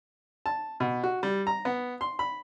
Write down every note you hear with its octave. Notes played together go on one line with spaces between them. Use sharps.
A5
B2
F#4
G3
A#5
B3
C6
B5